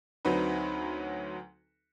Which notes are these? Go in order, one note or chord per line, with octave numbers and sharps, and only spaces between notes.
D2 F#3 C4 D#4 B4